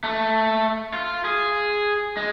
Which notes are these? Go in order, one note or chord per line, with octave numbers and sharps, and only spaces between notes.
A3
F4
G#4
G#3